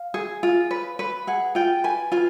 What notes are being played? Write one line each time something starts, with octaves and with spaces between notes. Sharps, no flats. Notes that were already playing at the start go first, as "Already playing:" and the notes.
Already playing: F5
G#4
F4
B4
B4
G#4 F#5
F4 G5
B4 G#5
F4 G#5